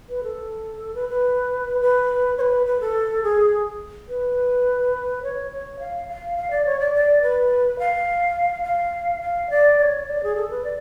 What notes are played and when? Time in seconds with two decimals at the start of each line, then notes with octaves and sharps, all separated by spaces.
0.10 B4
0.23 A4
0.95 B4
1.09 B4
1.81 B4
2.38 C#5
2.41 B4
2.66 B4
2.80 A4
3.23 G#4
4.09 B4
5.23 C#5
5.52 C#5
5.80 F5
6.08 F5
6.36 F5
6.51 D5
6.65 C#5
6.80 D5
6.94 D5
7.22 B4
7.79 F5
8.64 F5
9.22 F5
9.50 D5
9.78 D5
9.83 C#5
10.07 D5
10.23 G#4
10.36 A4
10.50 B4
10.64 D5